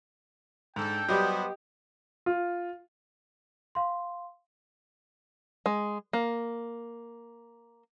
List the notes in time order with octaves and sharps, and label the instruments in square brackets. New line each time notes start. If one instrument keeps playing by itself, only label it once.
[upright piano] G#2 [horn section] D4 A4 [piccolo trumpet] G5
[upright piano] F#3 G3 [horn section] B3 B4 C5 [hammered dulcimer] G4 D#5
[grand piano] F4
[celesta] F5 C6
[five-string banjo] G#3
A#3